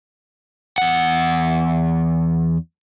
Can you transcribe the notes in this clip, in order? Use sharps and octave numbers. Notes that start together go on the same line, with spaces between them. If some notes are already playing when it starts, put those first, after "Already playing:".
E2 F#5